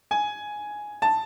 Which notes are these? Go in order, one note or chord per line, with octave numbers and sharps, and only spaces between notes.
G#5
A5